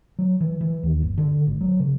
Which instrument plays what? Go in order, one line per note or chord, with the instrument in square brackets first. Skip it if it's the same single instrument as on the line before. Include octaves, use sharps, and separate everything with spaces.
[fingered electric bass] F#3
E3
E3
D#2
G1
D3
G#1
F#3
C#3